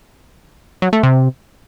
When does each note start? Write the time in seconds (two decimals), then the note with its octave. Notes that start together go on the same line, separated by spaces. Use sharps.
0.82 F#3
0.93 A3
1.03 C3